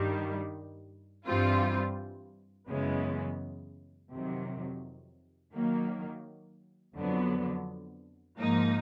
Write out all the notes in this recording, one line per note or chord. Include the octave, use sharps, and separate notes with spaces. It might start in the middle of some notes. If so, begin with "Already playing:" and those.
Already playing: G2 D#3 G3
G2 E3 G3 C4 F4
F#2 C#3 E3 G#3 B3
F2 C3 D#3 F#3
D#3 F#3 A#3
F2 D3 F#3 B3
G#2 F3 A#3 D#4